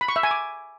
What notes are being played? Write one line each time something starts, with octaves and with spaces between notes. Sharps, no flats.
B5
C#6
E5
G#5
D6